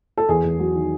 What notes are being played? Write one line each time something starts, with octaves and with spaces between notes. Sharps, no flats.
A4
E2 G#4
E2
F#3
D#3